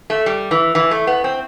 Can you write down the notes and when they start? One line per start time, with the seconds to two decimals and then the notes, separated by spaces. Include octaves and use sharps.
0.10 A3
0.26 G3
0.51 E3
0.75 E3
0.91 A3
1.07 B3
1.24 C4